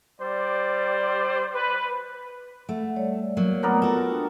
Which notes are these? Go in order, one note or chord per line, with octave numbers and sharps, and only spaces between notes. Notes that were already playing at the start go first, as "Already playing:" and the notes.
G3 C5 D5
B4
A3 F#5
G3 C#5 D5
F#3 A#3
A3 B3 A#4 D5
F4 F#4 A4
D4 G5